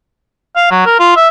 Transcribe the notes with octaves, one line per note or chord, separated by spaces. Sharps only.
F5
F#3
A#4
F4
E5